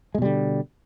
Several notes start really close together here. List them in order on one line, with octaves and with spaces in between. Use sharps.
G#3 B2 G3 D3